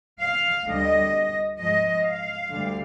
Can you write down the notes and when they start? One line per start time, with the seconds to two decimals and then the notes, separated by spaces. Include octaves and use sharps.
0.21 F5
0.66 D2 D3 G3 D#5
1.58 G#2 F3 G#3 D#5
2.04 F5
2.50 D2 D3 G3